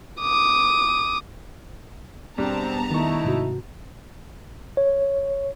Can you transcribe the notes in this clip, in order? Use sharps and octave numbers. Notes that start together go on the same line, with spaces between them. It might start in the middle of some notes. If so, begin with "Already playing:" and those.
D6 D#6
E1 G3 B3 C4 D4 A5 A#5
D#3 A3 D#4 E4 C#6
G#2 C3 F#4
C#5